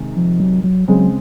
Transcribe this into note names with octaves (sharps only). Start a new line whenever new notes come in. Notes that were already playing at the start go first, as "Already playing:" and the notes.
Already playing: C3 D#3 G#3
F3
F#3
F#3
C#3 F#3 G#3 C4